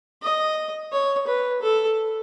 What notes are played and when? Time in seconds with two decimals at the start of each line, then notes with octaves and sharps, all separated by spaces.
0.22 D#5
0.92 C#5
1.27 B4
1.62 A4